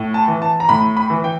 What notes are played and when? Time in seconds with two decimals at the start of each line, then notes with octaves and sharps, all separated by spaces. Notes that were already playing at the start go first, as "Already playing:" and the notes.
Already playing: A2
0.14 A5
0.28 E3
0.42 A5
0.60 A#5
0.69 A2 B5
0.97 B5
1.10 E3
1.24 G5